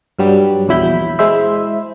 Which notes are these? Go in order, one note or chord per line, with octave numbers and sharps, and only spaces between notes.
G2 F#3 G3
A#1 E2 F#3 E4 B5 G6
G#3 E4 C5 E5